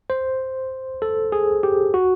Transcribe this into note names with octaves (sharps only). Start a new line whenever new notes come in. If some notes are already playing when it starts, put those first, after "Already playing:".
C5
A4
G#4
G4
F#4